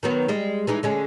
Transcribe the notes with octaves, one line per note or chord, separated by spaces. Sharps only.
D#3 F#3 B3
G3 G#3
E3 G#3 D#4
D3 G#3 C#4